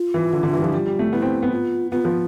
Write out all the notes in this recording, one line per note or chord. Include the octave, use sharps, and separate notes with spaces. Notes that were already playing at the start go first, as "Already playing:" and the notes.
Already playing: F4
E3
D3
D3
E3
G3
F3 E4
G3 F4
G3
A3
B3 E4
C4
B3
F4
B3 F4
F3